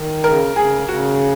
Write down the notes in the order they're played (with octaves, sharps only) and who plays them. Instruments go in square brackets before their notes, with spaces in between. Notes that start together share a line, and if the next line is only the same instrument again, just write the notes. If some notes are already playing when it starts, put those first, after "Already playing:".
Already playing: [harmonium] D#3
[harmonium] C#3 [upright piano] A#4
[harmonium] C#3 [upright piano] G#4
[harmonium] C#3 [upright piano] F#4